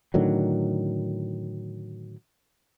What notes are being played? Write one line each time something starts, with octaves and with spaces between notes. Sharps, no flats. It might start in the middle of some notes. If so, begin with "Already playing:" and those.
A2 D3 D#3 F#3